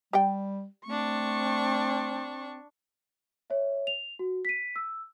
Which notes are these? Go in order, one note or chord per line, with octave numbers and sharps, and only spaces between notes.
G3 G4 D5 G5
A3 C4 D4 C#6
C#5 E5
F7
F#4
B6 D#7
E6